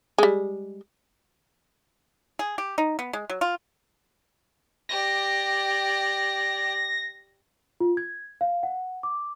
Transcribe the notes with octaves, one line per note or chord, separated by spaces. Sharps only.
G3 G#3
G#4
G4
D#4
B3
G#3
F#3
F4
G4 D5 A#6
F4
G#6
F5
F#5
D6